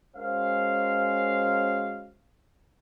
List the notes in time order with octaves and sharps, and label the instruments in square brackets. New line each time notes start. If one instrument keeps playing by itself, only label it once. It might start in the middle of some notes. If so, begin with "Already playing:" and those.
[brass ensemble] G#3 C#4 F#4 A#4 C5 F5